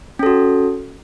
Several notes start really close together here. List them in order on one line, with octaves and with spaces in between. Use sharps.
C#4 A4 F#4